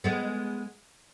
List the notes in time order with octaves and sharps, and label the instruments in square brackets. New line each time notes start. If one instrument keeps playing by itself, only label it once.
[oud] G#3 B3